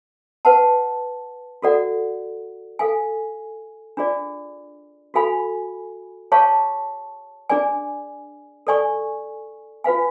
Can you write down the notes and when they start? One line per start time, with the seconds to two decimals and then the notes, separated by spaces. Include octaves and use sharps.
0.45 B4 F#5 A5
1.62 F#4 A4 D5 F#5
2.79 A4 F5 G#5
3.97 D4 F4 G#4 D5
5.14 F#4 A4 F5 G#5 B5
6.32 G#4 C#5 F5 A5 C#6
7.50 D4 G#4 D5 G#5
8.67 A4 D5 G#5 C#6
9.84 F4 B4 F5 G#5